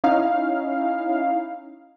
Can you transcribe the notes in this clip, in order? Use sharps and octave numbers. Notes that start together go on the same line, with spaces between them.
C#4 D#4 E4 F5